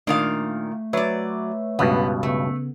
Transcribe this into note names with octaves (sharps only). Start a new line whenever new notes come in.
A#2 D#3 A3 D4 F5
F#3 B4 C#5 D5 E5
C#2 G2 B2 B3
C#3 A3 B3